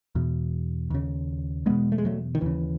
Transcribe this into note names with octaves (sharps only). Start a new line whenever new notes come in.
E2 B2
D#2 C#3
E2 B2 G#3 B3
A3
G#3
F#3 A3
D#3
D#2 C#3 E3